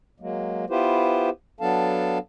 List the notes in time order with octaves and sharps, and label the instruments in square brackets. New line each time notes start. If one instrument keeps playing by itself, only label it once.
[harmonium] F#3 G#3 A#3
B3 E4 F4 G4 B4 C5
F#3 B3 D4 A4 F5 A5